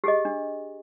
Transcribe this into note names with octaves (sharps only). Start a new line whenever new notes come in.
G4 G#4 D#5
D4